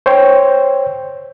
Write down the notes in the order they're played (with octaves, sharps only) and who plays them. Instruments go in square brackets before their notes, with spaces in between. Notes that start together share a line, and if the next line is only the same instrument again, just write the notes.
[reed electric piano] C5 C#5 G5